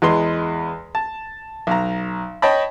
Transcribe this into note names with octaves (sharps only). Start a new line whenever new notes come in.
E2 G#3 B4 C6
A5
B1 A#5
C#5 D#5 G5 A5 B5